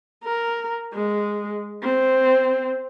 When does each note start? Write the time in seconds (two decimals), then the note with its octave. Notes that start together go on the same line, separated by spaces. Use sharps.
0.24 A#4
0.93 G#3
1.83 C4